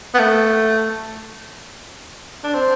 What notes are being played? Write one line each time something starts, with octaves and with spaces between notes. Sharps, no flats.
B3
A3
D4
C4